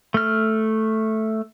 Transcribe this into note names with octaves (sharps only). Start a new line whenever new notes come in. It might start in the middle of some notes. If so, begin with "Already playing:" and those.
A3 F6